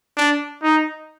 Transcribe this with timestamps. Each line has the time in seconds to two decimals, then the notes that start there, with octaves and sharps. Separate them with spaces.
0.17 D4
0.63 D#4